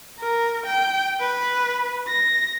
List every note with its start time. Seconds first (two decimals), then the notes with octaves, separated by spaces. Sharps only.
0.20 A#4
0.66 G5
1.20 B4
2.08 A#6